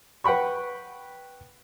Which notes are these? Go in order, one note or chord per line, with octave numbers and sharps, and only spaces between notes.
B4 F#5 G5 B5 C#6